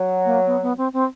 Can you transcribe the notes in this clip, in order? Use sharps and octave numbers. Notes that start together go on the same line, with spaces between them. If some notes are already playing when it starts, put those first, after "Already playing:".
Already playing: F#3
A#3
B3
B3
C4
C4